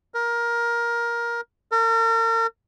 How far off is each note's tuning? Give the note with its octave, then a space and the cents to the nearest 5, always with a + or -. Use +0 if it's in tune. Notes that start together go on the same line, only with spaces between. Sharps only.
A#4 +15
A#4 -40